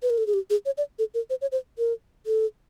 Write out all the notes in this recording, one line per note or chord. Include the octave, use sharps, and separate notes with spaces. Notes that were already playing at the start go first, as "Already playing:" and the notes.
B4
A#4
A4
G#4
G4
G#4
C#5
D5
A4
A#4
C5
C#5
C5
A#4
A4